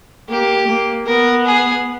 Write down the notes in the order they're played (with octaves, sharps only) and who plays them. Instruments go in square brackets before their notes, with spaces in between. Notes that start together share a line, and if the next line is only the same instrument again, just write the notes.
[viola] A#3 [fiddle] G4
[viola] A#3
[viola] B3 [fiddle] A#4
[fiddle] G#4